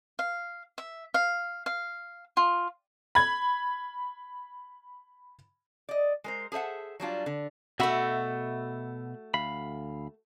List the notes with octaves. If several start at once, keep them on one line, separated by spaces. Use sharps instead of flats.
F5
E5
F5
F5
F4
B5 G#6
D5 D#5
G#3 A#4 C5
G#4 A4 C5 E5 F#5
F#3 G3 D4 F4
D3
B2 A3 F#4 E5 B5
D2 F5 B5